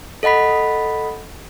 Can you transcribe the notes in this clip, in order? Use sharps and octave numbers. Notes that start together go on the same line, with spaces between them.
A4 D#5 F#5 B5 B6